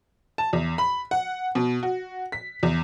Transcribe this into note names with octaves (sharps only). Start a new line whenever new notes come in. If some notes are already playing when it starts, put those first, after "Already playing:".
A5
E2
B5
F#5
B2
F#4
B6
E2